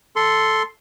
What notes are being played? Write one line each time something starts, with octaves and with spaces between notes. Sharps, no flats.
A4 C6